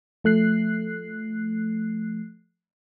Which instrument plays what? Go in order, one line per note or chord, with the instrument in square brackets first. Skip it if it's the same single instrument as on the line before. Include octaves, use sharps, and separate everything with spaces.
[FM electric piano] F3 A3 F#6 C7